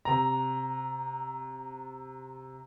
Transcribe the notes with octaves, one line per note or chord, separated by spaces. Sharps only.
C3 A#5